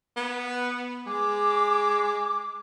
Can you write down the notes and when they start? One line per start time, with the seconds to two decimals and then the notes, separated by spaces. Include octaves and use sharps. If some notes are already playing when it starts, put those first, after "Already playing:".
0.16 B3
1.06 G#3 D6